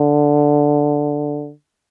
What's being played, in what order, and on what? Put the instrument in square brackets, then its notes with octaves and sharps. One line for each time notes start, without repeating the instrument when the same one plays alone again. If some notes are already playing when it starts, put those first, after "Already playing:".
Already playing: [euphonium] D3